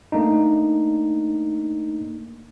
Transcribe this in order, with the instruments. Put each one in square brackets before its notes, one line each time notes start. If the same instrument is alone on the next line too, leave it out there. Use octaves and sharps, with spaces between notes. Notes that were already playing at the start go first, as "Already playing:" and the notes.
[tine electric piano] A3 A#3 D4 D#4